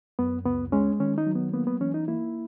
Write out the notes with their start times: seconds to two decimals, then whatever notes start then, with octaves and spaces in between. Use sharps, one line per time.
0.19 F#2 B3
0.45 C#2 B3
0.72 G#3 C#4
1.00 D#3 C#4
1.18 D#4
1.27 F#3
1.35 B3
1.54 A#3 B3
1.67 B3
1.80 E3 C#4
1.94 D#4
2.08 A#3 E4